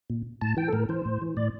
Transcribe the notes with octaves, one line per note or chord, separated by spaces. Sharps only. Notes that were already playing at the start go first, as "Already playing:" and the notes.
A#2
A2 A5
E3 G5
A4
A2 A#4
E3 C5
A2
E3
A2 D5